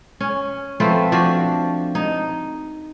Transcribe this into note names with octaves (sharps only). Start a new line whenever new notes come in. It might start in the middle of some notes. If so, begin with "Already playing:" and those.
C#4
F3 A3 C4 B4
F3 D4 F#4
D#4